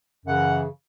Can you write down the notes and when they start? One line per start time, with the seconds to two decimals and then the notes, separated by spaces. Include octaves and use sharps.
0.26 F#2 C#3 E3 F#5